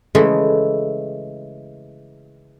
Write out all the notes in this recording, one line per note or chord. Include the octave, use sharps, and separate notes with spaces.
C#3 E3 G#3 A3 E4 A4